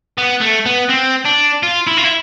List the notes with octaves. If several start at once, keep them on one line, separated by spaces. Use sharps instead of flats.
B3
A3
B3
C4
D4
F4
E4
F4
E4